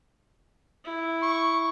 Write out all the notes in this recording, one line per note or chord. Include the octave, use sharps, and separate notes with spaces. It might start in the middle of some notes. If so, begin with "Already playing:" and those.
E4
C#6